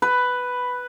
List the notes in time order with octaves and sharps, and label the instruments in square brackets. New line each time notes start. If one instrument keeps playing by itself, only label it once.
[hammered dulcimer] B4